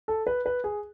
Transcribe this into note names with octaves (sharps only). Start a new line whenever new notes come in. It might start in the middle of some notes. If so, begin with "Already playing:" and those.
A4
B4
B4
G#4